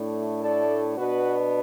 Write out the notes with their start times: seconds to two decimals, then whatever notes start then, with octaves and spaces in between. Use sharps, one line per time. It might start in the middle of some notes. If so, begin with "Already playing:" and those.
Already playing: A2 A3 D4
0.40 A4 D5
0.96 B2 B3 D4 F#4 B4